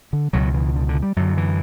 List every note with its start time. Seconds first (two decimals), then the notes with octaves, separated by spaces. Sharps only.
0.13 D3
0.33 C#2 B2 F#3
0.54 E3
0.76 D3
0.89 D3
1.02 G3
1.16 F#2 D3 F#3
1.38 E3